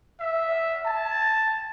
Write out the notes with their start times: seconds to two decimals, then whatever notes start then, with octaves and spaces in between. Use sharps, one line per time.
0.20 E5
0.85 A5